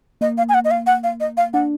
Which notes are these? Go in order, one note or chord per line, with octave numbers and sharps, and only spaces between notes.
A#3 D#5
F5
G#5
F#5
D#5
F5
F#5
F5
D#5
F5
D4 F#5